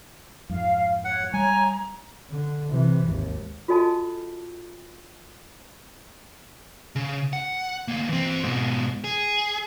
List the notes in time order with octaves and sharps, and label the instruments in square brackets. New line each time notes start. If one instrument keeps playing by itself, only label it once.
[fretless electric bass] F2 G#2 [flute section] F5
[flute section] C#5 [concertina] F#5
[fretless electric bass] G3 [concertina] G#5 [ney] A#5
[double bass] D3
C3 E3
G#1 D#2
[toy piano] F4 F#4 A4 D#5 G#5 A5
[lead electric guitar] C#3
F#5
D2 A#3
E3 C4
G#2 B2
G#4